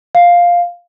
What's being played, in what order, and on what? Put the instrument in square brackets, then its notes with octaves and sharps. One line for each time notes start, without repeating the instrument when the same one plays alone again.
[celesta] F5